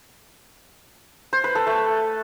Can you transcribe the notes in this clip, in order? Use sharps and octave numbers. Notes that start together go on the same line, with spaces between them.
C5
B4
A4
A3